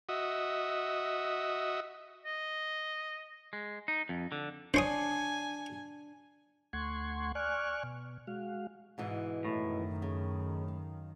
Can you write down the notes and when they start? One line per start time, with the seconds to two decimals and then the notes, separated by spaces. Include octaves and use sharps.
0.09 F#4 D#5 E5
2.25 D#5
3.53 G#3
3.88 D#4
4.09 F2
4.32 D3
4.74 D4 C5 C#5 G#5 D#6
6.73 D2 A3 F#5 C6 C#6 G#6
7.35 D5 G#5 C#6 F6 F#6
7.83 B2
8.27 G#3 F#4 F5
8.98 G#2 B2 E3
9.45 F#2 A2 D#3
10.02 C#3
10.68 F5